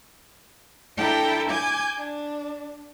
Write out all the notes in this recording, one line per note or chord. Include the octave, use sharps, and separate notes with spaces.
D4 E4 A4 G5 A5 A#5
G#5 D6 G6 G#6
D4